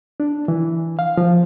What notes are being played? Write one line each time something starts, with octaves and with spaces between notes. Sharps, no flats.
D4
E3
F5
F3